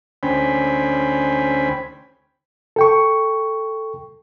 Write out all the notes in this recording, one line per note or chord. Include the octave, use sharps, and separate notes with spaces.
D2 C#4 C5 G5 G#5 B5
A4 G5 C#6